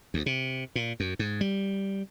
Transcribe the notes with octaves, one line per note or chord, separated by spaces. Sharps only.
D2
C3
A#2
F#2
G#2
G3